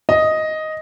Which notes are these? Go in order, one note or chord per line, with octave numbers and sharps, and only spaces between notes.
D#5